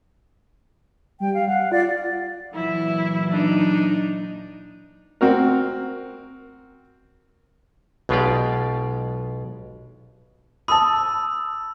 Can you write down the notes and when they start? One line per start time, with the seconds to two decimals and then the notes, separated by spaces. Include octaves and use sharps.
1.20 G3 G5
1.34 F5
1.48 F5 F#5
1.72 F4 D5
2.54 A#2 E3 F#3 E4
3.30 D4 D#4
5.21 C4 F#4 A#4
8.09 B1 B2 G#3 F4 G4 D5
10.68 A5 B5 D#6 E6